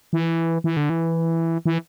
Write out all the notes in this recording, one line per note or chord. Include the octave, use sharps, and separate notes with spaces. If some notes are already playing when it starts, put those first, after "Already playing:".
E3
E3
D3
E3
E3